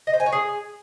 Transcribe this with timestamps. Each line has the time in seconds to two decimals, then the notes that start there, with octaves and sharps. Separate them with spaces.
0.07 D#5
0.13 C5
0.20 G#5
0.26 C#5
0.33 G#4